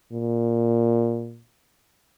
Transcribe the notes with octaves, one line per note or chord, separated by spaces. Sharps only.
A#2